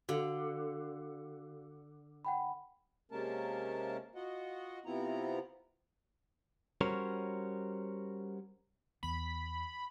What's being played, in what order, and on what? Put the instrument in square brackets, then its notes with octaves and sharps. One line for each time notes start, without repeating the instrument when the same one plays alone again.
[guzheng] D3 [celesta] F#4 F5
[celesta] F#5 G5 B5
[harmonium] C3 G#3 A#3 C#4 A#4 A5
F4 F#4 D#5 F#5
C3 B3 C4 E4 F4 A#5
[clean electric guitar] G3 C#4 F#4 A#4 C5 C#5
[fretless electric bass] E2 E3 B3 [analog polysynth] B5